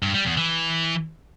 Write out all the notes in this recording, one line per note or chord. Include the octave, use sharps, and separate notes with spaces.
G2
G3
E2
E3